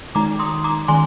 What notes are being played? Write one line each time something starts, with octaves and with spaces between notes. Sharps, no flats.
D#3 G#3 D#4 A#5 D6
C6 D#6
A#5 D6
D#3 G#3 G#5 C6